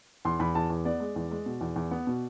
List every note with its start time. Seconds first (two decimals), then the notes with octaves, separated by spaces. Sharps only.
0.25 E2 C6
0.40 E2 B5
0.55 E2 A5
0.70 E2
0.85 B3 D5
1.00 G#3
1.16 E2
1.31 G#3
1.46 B2
1.61 E2
1.76 E2
1.91 B3
2.07 B2